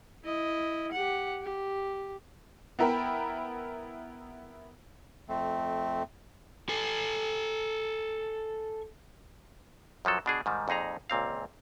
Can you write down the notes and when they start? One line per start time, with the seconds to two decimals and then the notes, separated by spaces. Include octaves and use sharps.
0.24 E4 D#5
0.92 G4 F#5
1.42 G4
2.79 B3 E4 A#4 G5 B5
5.29 F2 A3 C4
6.69 A4 G#5
10.05 F#2 F3 F#3 A4
10.26 B2 D4 G#4
10.46 G#2 D#3 G3
10.68 F2 A#2 D#4 G#4 A#5
11.10 C#2 A#2 C4 F5